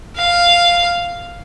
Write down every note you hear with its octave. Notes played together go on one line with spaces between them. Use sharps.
F5